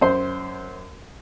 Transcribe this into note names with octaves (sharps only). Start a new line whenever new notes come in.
F#2 C5